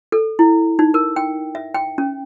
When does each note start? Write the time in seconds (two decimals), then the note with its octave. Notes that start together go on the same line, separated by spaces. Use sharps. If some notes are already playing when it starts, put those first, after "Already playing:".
0.12 A4
0.39 E4
0.79 D#4
0.94 A#4
1.16 G5
1.55 E5
1.74 G5
1.98 C#4